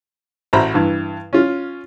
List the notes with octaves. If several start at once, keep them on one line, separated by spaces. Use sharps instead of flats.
A1 F#4 C5 A#5 B5
G2 E3
C#4 F4